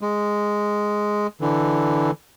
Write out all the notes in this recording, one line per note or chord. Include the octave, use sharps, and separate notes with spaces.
G#3
D3 E3